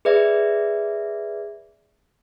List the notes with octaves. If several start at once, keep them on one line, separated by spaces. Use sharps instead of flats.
G#4 B4 D5 E5